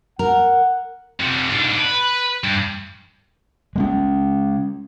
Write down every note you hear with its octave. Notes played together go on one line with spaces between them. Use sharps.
A#4 F#5
F2 C3
G#2 D4
B4
G2
G#3 A3 C#4